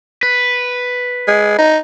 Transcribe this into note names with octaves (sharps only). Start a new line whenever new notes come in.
B4
G#3
D#4